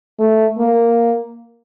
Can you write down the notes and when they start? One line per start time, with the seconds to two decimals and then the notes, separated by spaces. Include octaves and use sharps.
0.19 A3
0.58 A#3